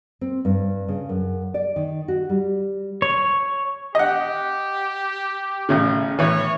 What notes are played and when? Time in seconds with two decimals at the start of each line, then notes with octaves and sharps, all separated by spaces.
0.21 C4
0.45 G2
0.88 C#3
1.09 F#2
1.54 D5
1.76 D#3
2.08 F#4
2.29 G3
3.02 C#5
3.95 G4 D#5 F#5
5.69 A1 A2 C#3
6.19 A2 E3 C#5